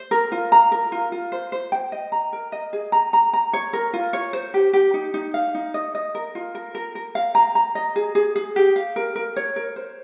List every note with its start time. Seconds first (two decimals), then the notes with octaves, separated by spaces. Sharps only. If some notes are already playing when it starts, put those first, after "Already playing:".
Already playing: C5
0.11 A#4
0.32 F4
0.52 A#5
0.72 A#4
0.92 F4
1.12 F4
1.32 C5
1.52 C5
1.72 G5
1.92 D#5
2.12 A#5
2.33 A#4
2.52 D#5
2.73 G#4
2.92 A#5
3.13 A#5
3.33 A#5
3.53 C#5
3.73 A#4
3.93 F4
4.13 C#5
4.33 C5
4.54 G4
4.73 G4
4.94 D#4
5.14 D#4
5.34 F5
5.55 D#4
5.74 D#5
5.95 D#5
6.15 A#4
6.35 F4
6.55 A#4
6.75 A#4
6.95 A#4
7.15 F5
7.35 A#5
7.55 A#5
7.75 D#5
7.96 G#4
8.15 G#4
8.36 G#4
8.56 G4
8.76 F5
8.96 A#4
9.16 A#4
9.36 C#5
9.56 A#4
9.76 C5